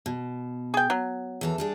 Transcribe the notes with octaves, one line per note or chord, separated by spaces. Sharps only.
B2
G#4 G5
F#3
E2 E3 A4
G3 D4 G#4